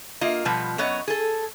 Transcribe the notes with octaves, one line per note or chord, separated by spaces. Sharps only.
A#3 F4 D#5
B2 F3 G3 B3
F#2 B3 C#5 D#5
G#4 A4